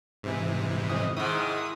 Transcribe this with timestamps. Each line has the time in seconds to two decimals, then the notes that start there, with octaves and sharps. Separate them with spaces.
0.23 G#2 C3 E3
0.89 F2 D#5 D#6
1.17 G#2 D#3 E4 D#6